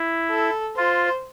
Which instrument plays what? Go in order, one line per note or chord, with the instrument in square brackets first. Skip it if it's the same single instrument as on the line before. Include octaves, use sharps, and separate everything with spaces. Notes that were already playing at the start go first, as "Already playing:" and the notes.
Already playing: [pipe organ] E4
[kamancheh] A4
[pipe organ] F4 [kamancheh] C5